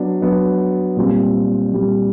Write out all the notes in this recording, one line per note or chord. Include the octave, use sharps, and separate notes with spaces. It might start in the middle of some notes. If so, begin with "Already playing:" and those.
Already playing: F#3 B3 D4
F#3 B3 D4
A#2 G3 C4
A#2 G3 C4